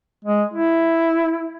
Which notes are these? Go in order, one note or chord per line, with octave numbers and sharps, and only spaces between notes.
G#3
E4